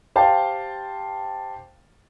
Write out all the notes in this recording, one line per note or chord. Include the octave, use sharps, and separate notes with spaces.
G4 C5 F5 G5 A5